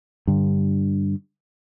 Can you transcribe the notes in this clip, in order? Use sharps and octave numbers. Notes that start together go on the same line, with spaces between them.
G2 D3